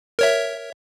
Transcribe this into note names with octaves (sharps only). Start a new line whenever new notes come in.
A#4 C#5 E5